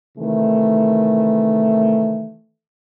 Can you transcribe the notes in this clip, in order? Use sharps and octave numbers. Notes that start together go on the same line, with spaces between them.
C3 D#3 E3 A3